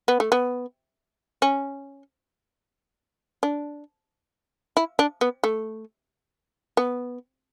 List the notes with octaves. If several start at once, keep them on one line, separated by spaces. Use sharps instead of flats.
B3
A3
B3
C#4
D4
E4
D4
B3
A3
B3